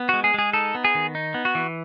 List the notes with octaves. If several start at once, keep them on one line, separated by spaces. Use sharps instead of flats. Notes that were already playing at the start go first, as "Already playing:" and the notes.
Already playing: B3
G#3 F#4
G#4
G#3 G#4
D#4 A4
B3
G#4
D#3
D#4
B3
F#4
E3